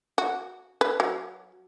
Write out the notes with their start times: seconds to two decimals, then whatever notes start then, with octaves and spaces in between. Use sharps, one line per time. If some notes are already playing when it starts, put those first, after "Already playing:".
0.18 F#4
0.81 B4
1.00 F#3